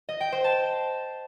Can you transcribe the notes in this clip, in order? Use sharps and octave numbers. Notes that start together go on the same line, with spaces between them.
D#5
G5
C5
A5